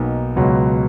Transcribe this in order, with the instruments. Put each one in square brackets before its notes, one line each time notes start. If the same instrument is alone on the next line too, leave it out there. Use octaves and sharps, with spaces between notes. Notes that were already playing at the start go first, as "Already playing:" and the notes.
Already playing: [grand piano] B1 B2 A#3 D#4
C#2 B2 F#3